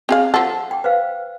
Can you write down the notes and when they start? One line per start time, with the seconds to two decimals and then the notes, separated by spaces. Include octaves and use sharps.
0.09 C4 G#4 F5
0.34 F3 A4 F#5
0.71 G5
0.84 B4 C5 F5